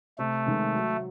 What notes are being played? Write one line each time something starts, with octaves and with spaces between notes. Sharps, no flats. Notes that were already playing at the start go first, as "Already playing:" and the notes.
C3 A3
D#3 G#3
F#3